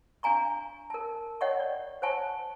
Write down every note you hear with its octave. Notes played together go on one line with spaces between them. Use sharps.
D4 F5 G#5 A#5 C#6
A#4 A5
C#5 D#5 F#5 G5 C#6
D5
C5 C#5 F#5 G#5 A5 C#6